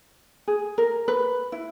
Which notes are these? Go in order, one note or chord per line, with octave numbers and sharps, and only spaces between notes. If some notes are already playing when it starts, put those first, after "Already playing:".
G#4
A#4
B4
E4